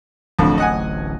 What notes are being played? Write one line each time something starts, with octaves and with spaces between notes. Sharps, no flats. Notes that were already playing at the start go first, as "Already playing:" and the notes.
D1 A1 F2 A2 D3 F#3
D#5 F#5 G#5